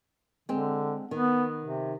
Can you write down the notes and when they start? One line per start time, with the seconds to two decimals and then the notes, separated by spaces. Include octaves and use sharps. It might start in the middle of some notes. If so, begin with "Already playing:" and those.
0.49 D3 G#3 C4
1.11 D#3 B3
1.61 C3